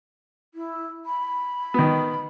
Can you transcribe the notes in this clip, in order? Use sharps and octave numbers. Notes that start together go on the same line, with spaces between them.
E4
B5
D#3 B3